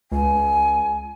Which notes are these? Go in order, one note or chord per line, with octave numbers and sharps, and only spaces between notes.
C#2 G#5